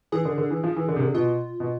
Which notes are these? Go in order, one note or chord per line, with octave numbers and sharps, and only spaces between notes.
E3 G#4
D3
D3
E3
F3
E3
D3
C3
D3
B2 F4
B2